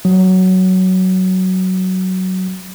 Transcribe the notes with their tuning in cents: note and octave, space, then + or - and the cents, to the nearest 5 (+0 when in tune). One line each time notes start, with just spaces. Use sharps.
F#3 +10